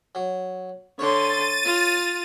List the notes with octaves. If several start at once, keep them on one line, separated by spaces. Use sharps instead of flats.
F#3
D3 C#5 C6 D6 A6 D#7
F4